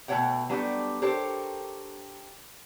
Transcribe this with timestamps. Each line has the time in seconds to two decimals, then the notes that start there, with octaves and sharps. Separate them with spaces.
0.08 B2 A3 C4 C#5 F#5 G5
0.49 F#3 G3 A3 B3 D4
1.02 D4 G4 A4 A#4 C5 C#5